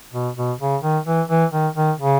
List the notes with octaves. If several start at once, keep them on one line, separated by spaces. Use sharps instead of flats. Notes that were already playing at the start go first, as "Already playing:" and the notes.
B2
B2
C#3
D#3
E3
E3
D#3
D#3
C#3